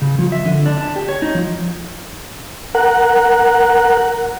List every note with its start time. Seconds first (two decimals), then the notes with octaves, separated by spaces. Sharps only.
0.02 C#3
0.19 F3
0.32 E5
0.45 D3
0.66 D4
0.81 A5
0.96 G4
1.09 C#5
1.22 D#4
1.35 F3
2.75 A#4 F#5